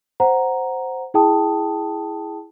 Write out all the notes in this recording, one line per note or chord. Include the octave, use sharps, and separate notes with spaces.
C5 F#5 A#5
E4 G#4 G5 A5 D#6